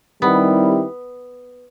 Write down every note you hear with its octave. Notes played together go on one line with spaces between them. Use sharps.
D#3 G3 B3 C4 E4 G4